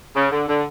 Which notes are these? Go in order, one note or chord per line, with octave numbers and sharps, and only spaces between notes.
C#3
D3
D3